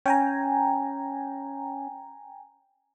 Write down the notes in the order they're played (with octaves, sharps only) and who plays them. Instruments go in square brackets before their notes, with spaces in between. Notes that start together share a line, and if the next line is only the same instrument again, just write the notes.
[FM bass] C#4 [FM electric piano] G5 G#5 A#5